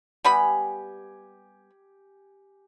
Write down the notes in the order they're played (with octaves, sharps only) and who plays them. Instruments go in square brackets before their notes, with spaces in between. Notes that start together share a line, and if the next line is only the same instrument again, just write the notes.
[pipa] G3 B3 B5 [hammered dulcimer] G4 G#5